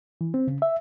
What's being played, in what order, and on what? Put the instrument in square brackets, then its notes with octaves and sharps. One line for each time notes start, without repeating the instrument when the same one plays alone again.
[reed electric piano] E3
C4
C#3
E5